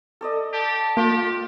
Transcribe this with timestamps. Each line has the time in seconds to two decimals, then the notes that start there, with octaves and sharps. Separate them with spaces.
0.21 A4 D5 D#5
0.53 G4 A5
0.97 A#3 F4 G4